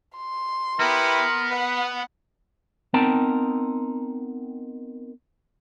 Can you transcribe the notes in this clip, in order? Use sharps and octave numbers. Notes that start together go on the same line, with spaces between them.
C6
B3 E4 G4 A#4 B4
B4 F#5
B3 C4 D#4 A#4 G5 A5